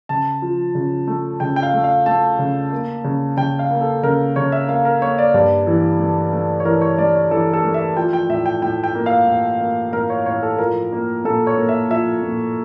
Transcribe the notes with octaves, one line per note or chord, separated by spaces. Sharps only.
C#3 A5
F3
C#3
A3
C#3 G5
G5
F5
A3
F5
A3 A5
C#3
A#3
C#3
C#3 G5
F5
A#3
A4
C#3 A#4
C#3 C#5
E5
A#3 F5
A#4
A#3 C#5
D5
G2 D5
E3
A3
A3
C#5
E3 A#4
C#5
A3 D5
C#5
E3 A4
A4
A3
E5
F3 G5
G5
A2 E5
G5
A2 G5
G5
A#3
F5
A2
A#3
A2 A#4
C#5
A2 C#5
A4
F3 A#4
A#3
A#2 A4
C#5
A#3
E5
F3 E5
A#2